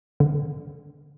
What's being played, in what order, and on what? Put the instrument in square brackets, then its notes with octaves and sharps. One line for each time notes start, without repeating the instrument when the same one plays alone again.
[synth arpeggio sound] D3